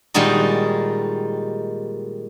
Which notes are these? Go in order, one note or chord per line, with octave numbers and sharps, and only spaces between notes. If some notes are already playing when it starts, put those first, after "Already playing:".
A#2 D#3 G3 G#3 D#4 F#4